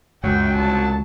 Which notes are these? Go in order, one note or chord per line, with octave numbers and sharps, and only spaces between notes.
C#2 F#2 F#3 G5
C2 A5